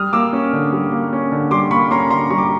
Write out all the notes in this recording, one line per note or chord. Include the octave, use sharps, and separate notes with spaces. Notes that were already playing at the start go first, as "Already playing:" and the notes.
Already playing: G3 D#6 F6
A#3 D6 E6
C#4
D3
G3
A#3
C#4
D3
G3 C6 D6
A#3 B5 C#6
C#4 A#5 C6
D3 A#5 C6
G3 C#6
D6